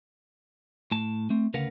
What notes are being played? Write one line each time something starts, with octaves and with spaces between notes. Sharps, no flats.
A2 A5
A3 C4
D2 C#3 A#4 B4 F5 F#5